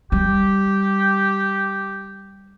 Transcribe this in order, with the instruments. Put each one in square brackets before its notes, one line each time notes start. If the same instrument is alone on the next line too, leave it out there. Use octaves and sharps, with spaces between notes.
[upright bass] G3 [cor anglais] G4